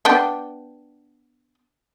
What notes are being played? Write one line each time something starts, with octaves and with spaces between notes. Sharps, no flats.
B3 D4 G4